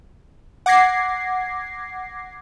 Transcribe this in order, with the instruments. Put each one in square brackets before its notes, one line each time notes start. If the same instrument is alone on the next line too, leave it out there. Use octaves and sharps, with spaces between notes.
[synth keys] F#5 D6 G#6 A#6 C7